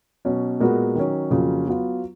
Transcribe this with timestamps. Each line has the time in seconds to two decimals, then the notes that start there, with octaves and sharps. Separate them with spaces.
0.25 B2 F#3 C#4
0.60 A#2 G#3 B3 F#4 A#4
0.95 D#3 F#3 C#4
1.31 F2 C#3 F#3 A#3 F4
1.66 F#3 B3 F4